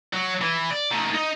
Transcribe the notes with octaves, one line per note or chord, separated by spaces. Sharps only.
F#3
E3
D5
D#3 A3
D#4